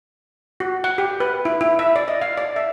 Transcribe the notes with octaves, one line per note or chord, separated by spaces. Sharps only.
F#4
F#5
G4
B4
E4
E4
E5
D5
D#5
F5
D5
E5